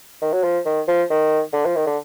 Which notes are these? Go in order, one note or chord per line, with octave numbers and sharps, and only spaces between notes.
D#3
F#3
F3
D#3
F3
D#3
D3
F3
D#3
D3